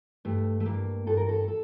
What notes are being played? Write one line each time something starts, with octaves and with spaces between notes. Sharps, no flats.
G2 A3
A3
G2 A#3
G2 A4
A#4
A4
A4